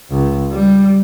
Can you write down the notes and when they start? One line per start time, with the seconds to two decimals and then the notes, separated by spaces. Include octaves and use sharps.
0.10 C#2
0.52 G3